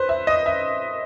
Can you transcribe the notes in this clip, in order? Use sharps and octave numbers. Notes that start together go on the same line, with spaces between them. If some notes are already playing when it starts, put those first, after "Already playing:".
Already playing: B4 C5
E5
D#5
E5